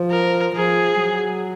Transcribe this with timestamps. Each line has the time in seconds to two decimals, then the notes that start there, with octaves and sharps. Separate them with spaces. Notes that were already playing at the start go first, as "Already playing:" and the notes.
Already playing: F3
0.11 A#4
0.56 F3 G#4
1.01 F#3